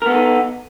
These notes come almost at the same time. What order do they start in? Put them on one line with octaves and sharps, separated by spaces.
A#4 B3 A4 D#4